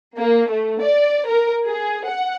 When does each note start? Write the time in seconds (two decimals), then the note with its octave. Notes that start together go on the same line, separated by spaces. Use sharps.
0.17 A#3
0.49 A3
0.81 D5
1.27 A#4
1.67 G#4
2.07 F#5